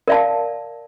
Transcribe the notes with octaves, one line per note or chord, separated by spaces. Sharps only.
A#4 D5 E5 F5 A5